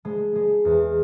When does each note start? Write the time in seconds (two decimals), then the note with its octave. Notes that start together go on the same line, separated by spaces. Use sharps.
0.05 G#3
0.35 G#3
0.65 E2